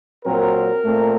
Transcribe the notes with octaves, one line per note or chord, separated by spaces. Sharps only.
A#2 F#3 C4 A#4
A#2 A3 C4